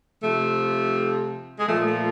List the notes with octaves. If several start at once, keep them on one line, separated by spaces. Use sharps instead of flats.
C3 F3 A3
G#3
A#2 F3 A3
A3